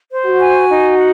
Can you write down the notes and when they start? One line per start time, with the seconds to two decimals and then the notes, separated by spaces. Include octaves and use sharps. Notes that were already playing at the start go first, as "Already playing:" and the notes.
0.11 C5
0.26 F#4
0.40 G#5
0.68 D#4
0.98 F#5